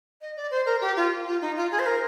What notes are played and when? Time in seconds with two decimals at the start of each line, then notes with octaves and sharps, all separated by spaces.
0.21 D#5
0.37 D5
0.51 C5
0.66 A#4
0.81 G4
0.96 F4
1.27 F4
1.41 D#4
1.57 F4
1.71 G#4
1.79 C5
1.86 A#4